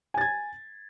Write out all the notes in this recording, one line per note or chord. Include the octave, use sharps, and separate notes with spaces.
G#5 G#6 A6